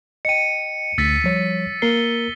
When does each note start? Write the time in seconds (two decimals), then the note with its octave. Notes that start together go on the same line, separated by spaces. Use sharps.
0.25 D#5 G5 C#7 D#7
0.98 D2 E6 A6 B6
1.24 F3 G3 C#5
1.82 A#3 A#4 C7 G7